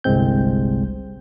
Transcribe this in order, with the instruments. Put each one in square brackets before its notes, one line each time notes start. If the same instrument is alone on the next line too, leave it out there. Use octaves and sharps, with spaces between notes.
[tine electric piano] G1 C2 G#3 C4 G6